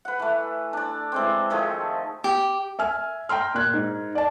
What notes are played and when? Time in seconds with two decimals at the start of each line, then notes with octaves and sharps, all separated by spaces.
0.05 B4 F#5
0.19 E3 A3
0.73 D4 D5
1.12 E3 G#3 C4
1.50 D#3 F3 A3 G#4
2.24 G4
2.79 E5 G#5 F6
3.29 G5 A#5 C6 F6
3.55 A#2 F#6 G#6
3.74 G#2
4.15 D5 A5